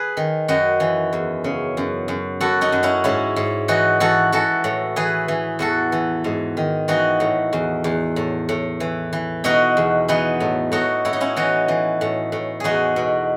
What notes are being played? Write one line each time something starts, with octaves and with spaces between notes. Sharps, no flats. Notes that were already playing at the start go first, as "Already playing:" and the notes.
Already playing: G#4 B4
D#3
F#2 D#4 F#4
E3
E2
C#3
F#2
F#2
F#2 F#4 A4
D#4 F#4
F#2
C#4 E4
G#2 C#4 E4
G#2
E3 D#4 F#4
E3 F#4 A4
E3 F#4 A4
A2
E3 G#4 B4
E3
E2 F#4 A4
E3
G#2
D#3
E3 D#4 F#4
A2
E2
E2
A2
A2
E3
E3
B2 D#4 F#4
E2
E3 B3 D#4
A2
A2 D#4 F#4
A2 E4
D#4
C#4 E4
E3 D#4 F#4
E3
A2
A2
E2 D#4 F#4 G#4
B2